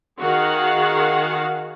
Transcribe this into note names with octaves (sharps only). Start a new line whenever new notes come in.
D#3 F#4 G#4 F5 F#5